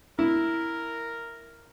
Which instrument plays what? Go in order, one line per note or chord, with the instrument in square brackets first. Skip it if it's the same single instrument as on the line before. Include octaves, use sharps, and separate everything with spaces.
[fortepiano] E4 [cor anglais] A#4